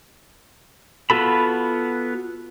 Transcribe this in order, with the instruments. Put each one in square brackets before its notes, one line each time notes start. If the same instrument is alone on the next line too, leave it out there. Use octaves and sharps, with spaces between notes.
[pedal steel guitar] B3 F4 F#4 A4 B5